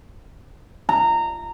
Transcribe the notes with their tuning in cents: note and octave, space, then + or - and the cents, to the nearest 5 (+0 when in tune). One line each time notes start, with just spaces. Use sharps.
A#5 -20